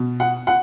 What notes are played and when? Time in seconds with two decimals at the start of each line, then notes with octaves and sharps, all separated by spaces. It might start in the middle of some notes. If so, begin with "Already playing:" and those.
Already playing: B2
0.20 F#5
0.47 F#5